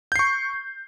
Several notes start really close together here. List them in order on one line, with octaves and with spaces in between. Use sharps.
G6 C7 C#6